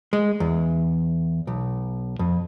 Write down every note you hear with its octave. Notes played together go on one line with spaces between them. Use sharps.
G#3
E2
B1
F2